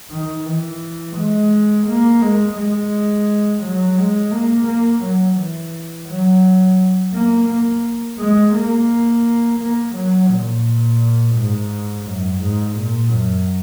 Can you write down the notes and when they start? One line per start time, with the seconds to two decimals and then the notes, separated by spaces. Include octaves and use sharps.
0.11 D#3
0.45 E3
1.16 G#3
1.87 A#3
2.22 G#3
2.56 G#3
3.62 F#3
3.97 G#3
4.32 A#3
4.67 A#3
5.03 F#3
5.38 E3
6.08 F#3
7.13 A#3
7.49 A#3
8.18 G#3
8.55 A#3
9.60 A#3
9.95 F#3
10.30 A#2
11.35 G#2
12.05 F#2
12.41 G#2
12.76 A#2
13.11 F#2